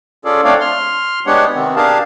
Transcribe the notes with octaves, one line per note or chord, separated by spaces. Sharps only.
C#4 F4 G#4 A4 D5
A3 C4 D4 C#5 D5 F5
C6 F6
G#3 B3 D4 G4 C#5 F#5
C3 D#3 B3 C4
D4 G4 G#4 A#4 F5 A5